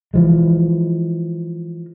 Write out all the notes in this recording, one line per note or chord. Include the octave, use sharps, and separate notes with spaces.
E3 F3 G#3